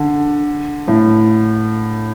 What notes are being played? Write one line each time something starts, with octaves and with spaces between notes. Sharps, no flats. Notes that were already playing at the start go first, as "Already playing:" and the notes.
Already playing: D3
A2